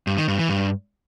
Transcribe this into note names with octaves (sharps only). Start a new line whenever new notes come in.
G2
D#3
G2
E3
G2